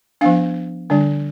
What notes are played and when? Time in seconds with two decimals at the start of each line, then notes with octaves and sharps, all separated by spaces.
0.21 F3 B3 D4 F5
0.90 D3 G3 D4